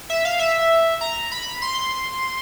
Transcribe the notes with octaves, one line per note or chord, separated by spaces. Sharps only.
E5
F5
E5
A#5
B5
C6